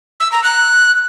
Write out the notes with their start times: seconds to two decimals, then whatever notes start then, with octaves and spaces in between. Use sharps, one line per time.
0.20 E6
0.32 A#5
0.44 F#6